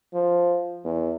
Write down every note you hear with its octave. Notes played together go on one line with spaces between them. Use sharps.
F3
E2